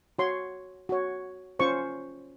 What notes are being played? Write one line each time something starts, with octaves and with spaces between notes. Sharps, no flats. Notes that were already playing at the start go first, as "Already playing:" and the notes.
F#4 C#5 C6
F#4 C#5
C#4 F4 C5 C#6